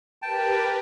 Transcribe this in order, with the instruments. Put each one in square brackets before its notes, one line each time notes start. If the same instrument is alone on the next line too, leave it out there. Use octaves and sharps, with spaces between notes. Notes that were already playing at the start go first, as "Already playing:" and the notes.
[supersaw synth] G4 A#4 B4 [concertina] G5 A5